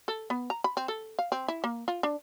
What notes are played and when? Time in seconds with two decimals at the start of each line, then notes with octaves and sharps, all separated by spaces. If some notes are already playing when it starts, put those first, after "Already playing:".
0.08 A4
0.30 B3
0.50 A#5
0.64 B5
0.77 C4
0.88 A4
1.19 F5
1.32 C4
1.48 E4
1.64 A#3
1.88 F4
2.03 D4